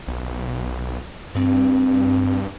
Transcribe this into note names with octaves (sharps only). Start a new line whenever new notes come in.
B1
G2 C4